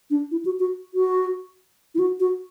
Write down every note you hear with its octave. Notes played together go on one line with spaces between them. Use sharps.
D4
E4
F#4
F#4
F#4
E4
F#4
F#4